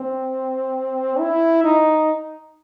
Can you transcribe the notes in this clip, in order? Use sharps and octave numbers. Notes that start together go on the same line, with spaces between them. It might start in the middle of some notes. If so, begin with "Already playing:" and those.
Already playing: C4
E4
D#4